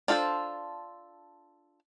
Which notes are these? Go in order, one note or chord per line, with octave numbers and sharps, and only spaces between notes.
D4 F4 A4 A#4 C5